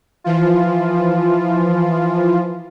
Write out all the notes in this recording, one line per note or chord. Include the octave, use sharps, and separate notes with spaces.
E3 F3 F4